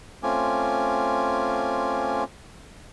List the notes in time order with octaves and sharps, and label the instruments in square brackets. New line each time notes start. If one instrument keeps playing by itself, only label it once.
[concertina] A3 C4 C#4 F4 G#5 D6